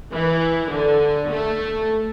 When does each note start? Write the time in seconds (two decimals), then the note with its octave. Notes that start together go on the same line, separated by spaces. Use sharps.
0.12 E3
0.71 D3
1.30 A3